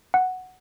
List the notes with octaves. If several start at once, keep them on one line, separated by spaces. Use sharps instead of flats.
F#5